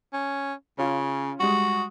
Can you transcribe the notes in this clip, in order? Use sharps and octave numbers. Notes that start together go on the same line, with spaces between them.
C#4
C#3 C#4 F4
G3 G#3 F#4